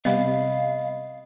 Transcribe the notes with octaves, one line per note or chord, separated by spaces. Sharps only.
C3 G3 B3 D#5 F5 B5